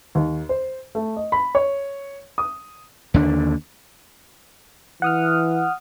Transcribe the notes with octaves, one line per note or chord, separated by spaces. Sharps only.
D#2
C5
A3
D#5
B5
C#5
D#6
D#2 D3 D4
E3 F#5 D#6 F6